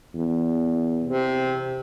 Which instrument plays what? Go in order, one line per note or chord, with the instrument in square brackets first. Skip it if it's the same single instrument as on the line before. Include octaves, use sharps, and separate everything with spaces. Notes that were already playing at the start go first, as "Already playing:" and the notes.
[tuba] E2
[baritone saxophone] C3